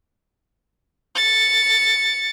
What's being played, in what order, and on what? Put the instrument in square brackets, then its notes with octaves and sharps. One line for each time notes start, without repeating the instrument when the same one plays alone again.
[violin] A6 C#7